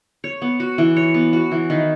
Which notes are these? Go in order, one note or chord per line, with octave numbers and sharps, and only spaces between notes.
C#5
B3
F#4
E3
C#5
B3
F#4
E3
D#3